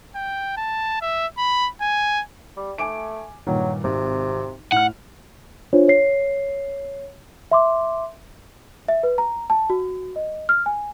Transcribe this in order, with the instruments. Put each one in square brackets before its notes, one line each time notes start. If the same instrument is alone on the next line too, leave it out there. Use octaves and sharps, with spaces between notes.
[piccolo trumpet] G5
A5
E5
B5
G#5
[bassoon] G3
[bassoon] A3 [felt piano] G#5 D6 D7
[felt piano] G2 A#2 D#3 [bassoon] F#3
[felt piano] G#1 [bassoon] C3
[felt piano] A2 F6 [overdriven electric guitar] F#5
[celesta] D4 F4 C5 C#5
C#5 C7
E5 C6 D6
E5
B4
A#5
A5
F#4
D#5
F6
G#5